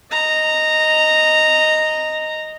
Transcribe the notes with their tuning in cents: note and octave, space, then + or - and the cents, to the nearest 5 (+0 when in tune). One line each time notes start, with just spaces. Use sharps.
D#5 +0 A#5 -10